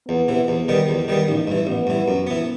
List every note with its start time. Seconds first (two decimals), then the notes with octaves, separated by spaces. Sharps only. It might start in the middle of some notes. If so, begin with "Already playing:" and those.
0.08 E2 B3
0.28 C3 E3
0.48 E2
0.68 D#3 G3 B3
0.89 E2
1.08 D#3 G3 B3
1.28 A1 D#4
1.47 G2 E3
1.67 A1 B3
1.87 G2 E3
2.08 F#2
2.27 E3 B3